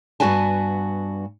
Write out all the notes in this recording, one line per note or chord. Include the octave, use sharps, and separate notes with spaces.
G2 B3 F#4 B4 G#5 A5